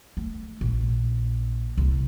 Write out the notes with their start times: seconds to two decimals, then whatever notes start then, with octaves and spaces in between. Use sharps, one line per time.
0.17 A3
0.61 A#1
1.78 C2